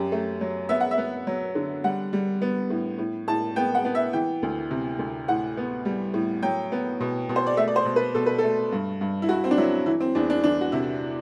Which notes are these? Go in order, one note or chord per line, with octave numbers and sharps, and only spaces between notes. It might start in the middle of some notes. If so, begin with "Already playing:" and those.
Already playing: F#2 F#3 G4
A3
F#3
B3 E5
F#5
E5
B3
F#3
D3
G3 F#5
G3
B3
A2
A2
A2 A5
B3 G5
F#5
B3
E5
E3 G5
D2
C3
D2
A2 F#5
B3
G3
A2
F#3 G5
B3
B2
B2
C5
D5
A3 E5
D5
C5
B2
B4
B2 A4
B4
A4
A3
G2
G2
E4
G2 F#4
C4
D4
F#3 E4
E3 E4
C4
E2 D4
D4
E3 D4
F#4
C3 E4